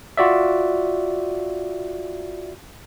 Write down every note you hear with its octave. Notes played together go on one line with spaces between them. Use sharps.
F4 F#4 D5 E5